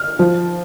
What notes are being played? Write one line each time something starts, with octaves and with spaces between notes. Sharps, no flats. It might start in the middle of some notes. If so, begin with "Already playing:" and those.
Already playing: F6
F3